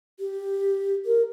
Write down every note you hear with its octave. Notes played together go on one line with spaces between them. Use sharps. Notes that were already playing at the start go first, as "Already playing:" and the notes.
G4
A#4